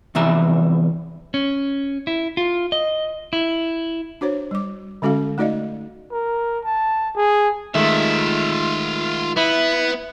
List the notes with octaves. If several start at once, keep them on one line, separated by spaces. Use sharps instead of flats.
E2 C3 E3 F3 E5 A#5
C#4
E4
F4
D#5
E4
D4 F#4 C5 C#5
G3 D6
D3 G#3 C#4 F#4 A4 F5
A3 D#4 F#4 D5 D#5 F5
A#4
A5
G#4
D#3 G#3 A3 F4 E5
B3 E4